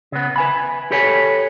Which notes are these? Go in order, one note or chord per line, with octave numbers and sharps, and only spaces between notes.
C#3 B3
B4 G#5 B5
G4 A4 B4 C#5 G#5